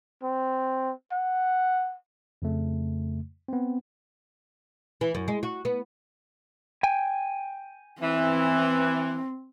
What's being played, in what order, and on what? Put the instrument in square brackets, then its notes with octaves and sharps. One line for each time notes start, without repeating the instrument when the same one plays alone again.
[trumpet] C4
F#5
[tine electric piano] F2 C#3 A3
B3 C4
[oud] E3
F#2
G#3
F#4
B3
[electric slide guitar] G5 G#5
[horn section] E3 [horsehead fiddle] C4